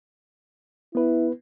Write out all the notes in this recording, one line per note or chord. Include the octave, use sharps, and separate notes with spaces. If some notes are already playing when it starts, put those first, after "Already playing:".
B3 E4 B4